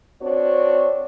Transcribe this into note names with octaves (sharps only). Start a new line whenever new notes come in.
C4 D4 F#4 C#5